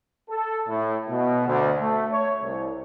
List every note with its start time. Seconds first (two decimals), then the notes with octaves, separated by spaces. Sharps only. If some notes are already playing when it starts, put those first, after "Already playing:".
0.29 A4
0.67 A2
1.09 B2
1.47 D2
1.79 A3
2.11 C#5
2.42 C2